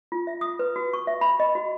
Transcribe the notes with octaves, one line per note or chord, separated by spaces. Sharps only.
F4
E5
D#6
B4
F#4
C#6
E5
B5
D#5
F#4